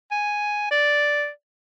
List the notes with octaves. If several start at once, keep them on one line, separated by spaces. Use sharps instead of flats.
G#5
D5